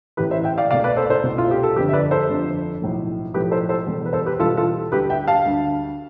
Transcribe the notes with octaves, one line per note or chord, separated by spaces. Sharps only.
A1 A2 E3 G4 B4
C5 E5
E5 G5
D5 F5
C2 B2 A3 D5 F5
B4 D5
A4 C5
D5
A4 C5
C2 B2 A3
F4
G4
A4
G1 F2 D3 F3 G4 B4
E5
B4 D5
A4 C5
G1 F2 D3 F3
B1 A2 F3 A3
B1 A2 F3 A3 G4 B4
A4 C5
A4 C5
E2 B2 G3
B4
A4 C5
G4 B4
E2 B2 G3 F4 A4
F4 A4
D2 D3 G3 G4 B4
E5 G5
F5 A5
D2 D3 G3